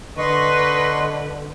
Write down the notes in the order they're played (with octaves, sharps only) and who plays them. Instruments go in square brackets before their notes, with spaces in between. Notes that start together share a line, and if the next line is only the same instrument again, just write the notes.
[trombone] D3 [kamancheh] B4 [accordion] D#5 C6 C#6